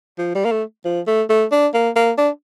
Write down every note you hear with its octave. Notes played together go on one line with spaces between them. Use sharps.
F3
G3
A#3
A3
F3
A3
A3
D4
A#3
A#3
D4